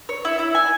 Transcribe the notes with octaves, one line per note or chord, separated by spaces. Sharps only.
C#5
E4
E4
G#5